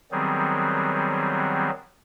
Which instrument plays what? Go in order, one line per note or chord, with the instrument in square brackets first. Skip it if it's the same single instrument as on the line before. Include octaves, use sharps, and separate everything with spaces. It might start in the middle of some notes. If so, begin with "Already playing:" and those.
[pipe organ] D#3 F#3 G3 B3 C4 G#4